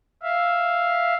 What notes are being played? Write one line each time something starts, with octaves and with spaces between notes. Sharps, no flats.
E5 F5